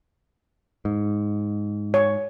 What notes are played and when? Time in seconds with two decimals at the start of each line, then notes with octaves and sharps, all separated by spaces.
0.85 G#2
1.94 C#5